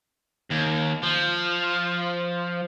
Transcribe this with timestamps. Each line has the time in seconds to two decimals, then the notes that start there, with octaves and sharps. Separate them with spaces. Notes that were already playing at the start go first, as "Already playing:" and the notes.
0.50 D#2
1.03 F3